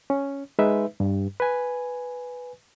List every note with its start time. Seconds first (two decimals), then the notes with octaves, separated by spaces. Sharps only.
0.10 C#4
0.59 G#3 D#4 B4 E5
1.00 G2
1.40 B4 G#5